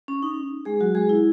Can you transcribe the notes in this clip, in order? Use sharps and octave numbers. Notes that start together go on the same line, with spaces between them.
C#4
D#4
G#3 G#4
F#3 F#4
G#3 G#4
E4